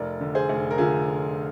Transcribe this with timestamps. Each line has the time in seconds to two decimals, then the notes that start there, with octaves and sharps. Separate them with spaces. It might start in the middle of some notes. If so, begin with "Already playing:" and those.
Already playing: F1 A#4 D5
0.21 D3
0.35 G#4 C5
0.49 F1
0.71 A#4
0.78 D3 F4 G#4